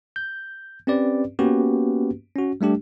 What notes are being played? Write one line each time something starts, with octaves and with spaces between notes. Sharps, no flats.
G6
C4 C#4 G4 B4 D5
A#3 B3 C#4 F#4 G4 B4
C#4 F#4
G3 A3 D4 G4